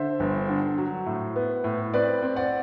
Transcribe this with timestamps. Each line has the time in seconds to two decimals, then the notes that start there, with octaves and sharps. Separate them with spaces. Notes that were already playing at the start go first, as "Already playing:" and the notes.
Already playing: D3 C5 E5
0.20 G1
0.49 D3
0.78 F#3
1.06 A2
1.36 B3
1.64 A2
1.94 C4 B4 D5
2.22 C4
2.36 D5 F#5